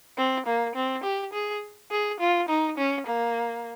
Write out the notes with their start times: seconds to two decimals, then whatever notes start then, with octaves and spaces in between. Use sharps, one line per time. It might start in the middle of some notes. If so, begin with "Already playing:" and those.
0.17 C4
0.46 A#3
0.75 C4
1.03 G4
1.33 G#4
1.91 G#4
2.20 F4
2.49 D#4
2.78 C#4
3.06 A#3